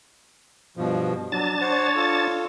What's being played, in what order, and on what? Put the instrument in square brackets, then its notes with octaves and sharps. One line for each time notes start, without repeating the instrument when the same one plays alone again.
[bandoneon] G2 B2 F3
[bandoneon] F#3 [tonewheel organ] D4 A5 A6
[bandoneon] C5 F#5 [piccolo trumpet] C#5
[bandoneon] F4 A4